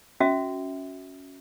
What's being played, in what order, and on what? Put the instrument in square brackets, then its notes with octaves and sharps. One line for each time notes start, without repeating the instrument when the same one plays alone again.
[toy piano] C#4 F#4 E5